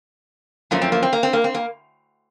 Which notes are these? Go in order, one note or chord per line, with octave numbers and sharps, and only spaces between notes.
F#2 F3 A3 A#3
C4
A#3
C4
A#3
C4
A#3
C4
A#3